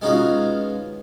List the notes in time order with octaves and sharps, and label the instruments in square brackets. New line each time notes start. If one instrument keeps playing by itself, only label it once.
[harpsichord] G#3 B3 C#4 D#4 F4 F#4